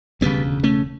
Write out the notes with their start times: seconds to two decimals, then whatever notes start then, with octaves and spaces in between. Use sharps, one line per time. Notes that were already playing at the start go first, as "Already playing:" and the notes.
0.21 E1 D2 C#3 G3 B3
0.63 A3 C#4